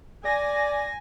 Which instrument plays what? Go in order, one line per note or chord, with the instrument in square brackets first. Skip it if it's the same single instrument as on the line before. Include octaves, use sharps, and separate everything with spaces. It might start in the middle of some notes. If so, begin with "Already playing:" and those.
[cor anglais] D5 [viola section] G#5 [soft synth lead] A#6